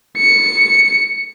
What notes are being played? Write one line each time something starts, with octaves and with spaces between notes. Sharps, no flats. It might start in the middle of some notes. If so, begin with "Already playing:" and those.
C#7